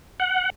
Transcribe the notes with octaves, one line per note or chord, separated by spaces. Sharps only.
F#5